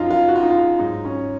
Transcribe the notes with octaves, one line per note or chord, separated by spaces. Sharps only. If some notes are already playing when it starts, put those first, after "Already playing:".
Already playing: F#2 F3 D#4 F4
F4
F#4
F4
D#4
F4
G#2 F#3 D#4
C#4